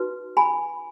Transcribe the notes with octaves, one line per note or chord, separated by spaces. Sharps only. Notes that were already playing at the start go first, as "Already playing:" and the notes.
Already playing: D#4 F#4 B4
G#5 B5